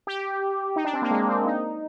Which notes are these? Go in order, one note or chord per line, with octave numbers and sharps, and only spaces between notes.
G4
D#4
D4
C4
A#3
G#3
C4
D#4